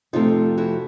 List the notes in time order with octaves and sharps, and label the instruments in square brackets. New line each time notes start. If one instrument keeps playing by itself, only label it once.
[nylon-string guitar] F2 C3 F3 A3 D#4 F4
E4 F#4